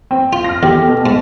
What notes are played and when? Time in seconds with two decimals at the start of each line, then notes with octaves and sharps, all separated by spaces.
0.11 C4
0.33 F4
0.44 F6 A#6
0.63 E2 G4 A4
0.88 B2
1.06 G#2